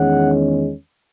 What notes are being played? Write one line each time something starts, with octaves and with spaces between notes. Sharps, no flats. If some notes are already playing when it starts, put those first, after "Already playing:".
Already playing: E2 D#3 G#3 C#4 F#5